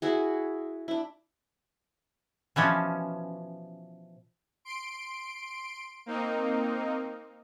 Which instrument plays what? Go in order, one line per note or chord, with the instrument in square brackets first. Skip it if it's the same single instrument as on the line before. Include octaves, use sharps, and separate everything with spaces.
[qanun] E4 F#4 G#4
D4 E4
[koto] B2 E3 F3 C#4
[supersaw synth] C6 D7
A#3 C4 D#4